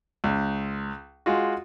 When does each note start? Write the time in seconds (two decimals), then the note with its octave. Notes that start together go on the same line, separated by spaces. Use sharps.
0.24 C#2
1.26 G#3 F4 F#4